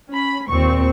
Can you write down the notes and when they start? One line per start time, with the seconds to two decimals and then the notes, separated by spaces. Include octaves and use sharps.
0.10 C#4 B5
0.48 D#2 A#2 C4 C#6